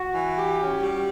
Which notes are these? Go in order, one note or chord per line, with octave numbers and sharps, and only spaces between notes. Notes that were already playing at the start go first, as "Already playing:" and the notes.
Already playing: F#4
E3
G4
C#4
G3